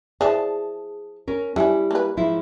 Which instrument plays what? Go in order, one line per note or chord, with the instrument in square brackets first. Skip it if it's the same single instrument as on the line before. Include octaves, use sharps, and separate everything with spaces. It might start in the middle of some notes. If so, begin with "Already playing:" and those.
[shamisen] E3 F3 D5 [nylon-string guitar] G#4 A5
[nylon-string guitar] C#4 A#4
[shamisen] E3 C#4 [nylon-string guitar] G3 E4
[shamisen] A#3 B4
[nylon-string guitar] G#2 F3 E4